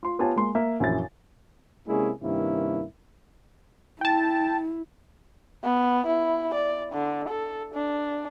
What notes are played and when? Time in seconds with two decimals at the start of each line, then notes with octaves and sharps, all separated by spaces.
0.03 F4 C6
0.19 B3 F4 G4 C#5 G#5 A5
0.36 G#3 A#3 C6
0.55 A#3 E5
0.80 A#1 F#2 E3 E4 A6
1.87 C3 G#3 A#3 C#4 E4 G#4
2.22 G2 C3 D#3 A#3 C#4 E4
4.01 E4 G5 A5
5.63 B3
6.06 E4
6.54 D5
6.92 D3
7.28 A4
7.74 D4